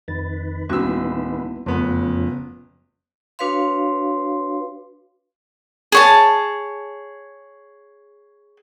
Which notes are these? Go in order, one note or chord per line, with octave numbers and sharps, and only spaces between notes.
F2 D#3 B4 A6
D1 G3 A#3 B3 C#4 E4 F#4 E6
F#1 F2 C#3 F3 A3 B3
D4 F#4 B4 C#5 F5 C6
G#4 C#5 A5